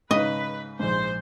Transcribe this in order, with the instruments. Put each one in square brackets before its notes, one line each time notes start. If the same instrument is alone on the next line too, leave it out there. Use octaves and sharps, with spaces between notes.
[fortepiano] G#2 C#3 D#4 [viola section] B4 [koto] D#5
[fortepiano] A#1 G#2 [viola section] C5